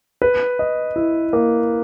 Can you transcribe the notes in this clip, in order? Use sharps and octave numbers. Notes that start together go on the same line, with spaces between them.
B4
D#5
E4
A#3